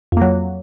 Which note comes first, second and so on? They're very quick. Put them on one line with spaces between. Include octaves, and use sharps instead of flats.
F2 A#3 F#3